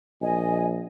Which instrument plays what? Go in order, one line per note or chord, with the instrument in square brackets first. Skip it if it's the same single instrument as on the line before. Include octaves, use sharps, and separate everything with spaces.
[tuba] A#1 [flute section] D#5 G#5